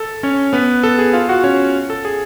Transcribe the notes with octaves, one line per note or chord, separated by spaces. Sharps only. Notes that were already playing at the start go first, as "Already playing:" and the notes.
Already playing: A4
C#4 C#5
B3 B4
A4
G#4
F4 F5
F#4 F#5
C#4 C#5
A4
G#4